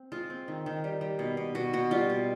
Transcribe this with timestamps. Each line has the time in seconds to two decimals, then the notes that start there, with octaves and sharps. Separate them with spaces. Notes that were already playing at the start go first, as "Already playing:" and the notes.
Already playing: C4
0.12 G#3 F4
0.30 C4
0.48 D#3
0.66 D#3
0.84 G3
1.01 G3
1.19 B2
1.37 B2
1.55 B2 F#4
1.73 B2 F#4
1.91 G3 F4
2.10 B2